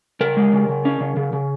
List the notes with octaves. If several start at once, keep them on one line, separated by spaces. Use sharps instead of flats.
C#3 A#4
G#3
C#3
C#3
C#4
C#3
C#3
C#3